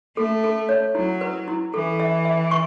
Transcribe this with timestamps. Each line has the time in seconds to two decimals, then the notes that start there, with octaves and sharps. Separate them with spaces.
0.17 A3 A4
0.44 A4
0.69 C#5
0.95 F#3 E4
1.21 B4
1.48 E4
1.73 E3 A4
2.00 E5
2.25 E5
2.51 C#6